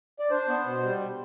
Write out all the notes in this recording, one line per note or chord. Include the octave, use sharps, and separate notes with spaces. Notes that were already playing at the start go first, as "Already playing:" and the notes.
D5
D4 C5
B3
B2
G3